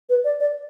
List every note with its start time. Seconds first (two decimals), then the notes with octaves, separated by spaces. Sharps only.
0.09 B4
0.24 D5
0.40 D5